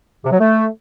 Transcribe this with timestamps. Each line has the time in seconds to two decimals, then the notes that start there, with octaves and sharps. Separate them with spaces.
0.24 C3
0.31 F#3
0.39 A3